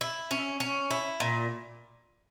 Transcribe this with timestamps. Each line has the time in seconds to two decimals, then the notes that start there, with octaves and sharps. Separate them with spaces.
0.01 E4
0.31 C#4
0.60 C#4
0.91 E4
1.20 A#2